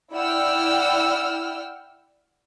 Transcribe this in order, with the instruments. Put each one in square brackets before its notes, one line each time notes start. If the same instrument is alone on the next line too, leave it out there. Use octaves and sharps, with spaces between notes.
[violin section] E4 D5 F#5 G5 E6 F6